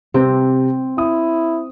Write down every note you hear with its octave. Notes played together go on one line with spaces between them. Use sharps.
C3 C4
E4 D#6